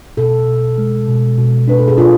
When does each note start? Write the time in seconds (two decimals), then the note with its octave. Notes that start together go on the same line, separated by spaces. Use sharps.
0.17 B2 A4
0.47 B2
0.78 G#3
1.08 B2
1.38 B2
1.68 D4 B4
1.79 A4
1.88 G#4
1.98 D4 F4